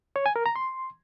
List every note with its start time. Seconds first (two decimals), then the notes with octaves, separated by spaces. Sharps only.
0.16 C#5
0.26 G#5
0.36 A#4
0.46 A#5
0.56 C6